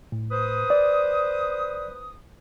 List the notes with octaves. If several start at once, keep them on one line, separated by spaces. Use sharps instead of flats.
A2
B4 C5 D#6
D5